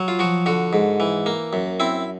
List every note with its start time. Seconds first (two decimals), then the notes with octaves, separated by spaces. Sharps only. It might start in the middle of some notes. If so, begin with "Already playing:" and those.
Already playing: F#3
0.08 F4
0.19 F3 F#4
0.46 D3 F#4
0.73 G#2
1.00 E3
1.26 A#3
1.53 F#2
1.80 C4 E4